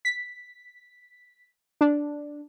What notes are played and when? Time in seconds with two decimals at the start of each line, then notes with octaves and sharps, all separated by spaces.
0.05 B6
1.81 D4